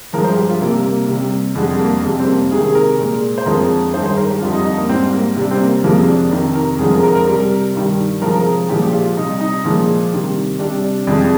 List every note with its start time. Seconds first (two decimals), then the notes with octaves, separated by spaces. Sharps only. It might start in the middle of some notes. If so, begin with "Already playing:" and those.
0.13 G2 F3 G#3 A#4
0.24 C5
0.36 G4
0.49 F4
0.60 C3 G3 A#3
0.85 A#3
1.09 C3 G3
1.55 F2 D3 G3 G#3
1.79 A#3
2.03 F2 C3 G3 G#3
2.20 C4
2.27 A#3
2.51 C3 D#3 G#3 G#4
2.65 G#4
2.75 A#4
2.99 A#2 G#3
3.38 C5
3.46 F2 D3 F3 G#3 A#4
3.94 G2 D#3 G#3 C5
4.06 C5
4.17 A#4
4.30 G4
4.41 F2 D3 G3 F4
4.53 D#4
4.65 D#4
4.77 A#3
4.89 G#2 G3 C4
5.13 A#3
5.37 C3 G3 D4
5.51 C4
5.60 A#3
5.84 F2 C3 F3 G#3 A#3
6.08 D4
6.31 F2 C3 D#3 A#4
6.55 A#4
6.79 F2 D3 F3 G#3 G#4
6.91 A#4
7.03 A#4
7.15 A#4
7.27 C3 G3
7.75 G2 D#3 G3
8.22 C3 F3 G#3 A#4
8.34 A#4
8.46 G#4
8.69 A#2 F3 G#3 G4
8.82 G4
8.93 F4
9.17 C3 G3 D#4
9.40 D#4
9.65 A#2 F3 G#3
10.12 C3 D#3 G3
10.59 C3 G3 D4
10.84 D4
11.07 F2 C3 F3 G#3 D4